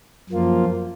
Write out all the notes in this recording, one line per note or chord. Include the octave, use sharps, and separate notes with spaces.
F#2 F3 A#3 F4